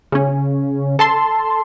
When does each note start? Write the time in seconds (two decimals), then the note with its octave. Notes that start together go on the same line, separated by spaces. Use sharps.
0.12 C#3 C#4
0.99 A4 A5 C6